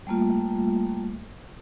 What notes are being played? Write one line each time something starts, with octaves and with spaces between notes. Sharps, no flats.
G3 A3 A#3 F4